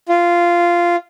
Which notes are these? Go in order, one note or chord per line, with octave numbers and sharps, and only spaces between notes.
F4